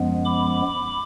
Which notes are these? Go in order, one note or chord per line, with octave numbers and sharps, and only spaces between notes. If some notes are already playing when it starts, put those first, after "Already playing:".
Already playing: F#2 F3 G#3 B3
B5 D6